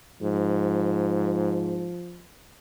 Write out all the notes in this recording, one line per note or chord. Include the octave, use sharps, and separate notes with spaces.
G#2 F3